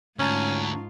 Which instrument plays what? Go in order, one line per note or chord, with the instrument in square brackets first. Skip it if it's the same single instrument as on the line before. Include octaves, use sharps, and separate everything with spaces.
[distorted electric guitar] D2 [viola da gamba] G#2 F4 [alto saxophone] C#4 [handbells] A5 A#5 C#6